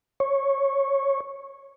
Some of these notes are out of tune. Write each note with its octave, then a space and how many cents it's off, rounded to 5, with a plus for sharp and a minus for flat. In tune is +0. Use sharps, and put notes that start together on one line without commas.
C#5 -10